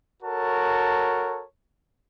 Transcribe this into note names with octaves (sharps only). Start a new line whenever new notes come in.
F#4 A4 A#4 C#5 A5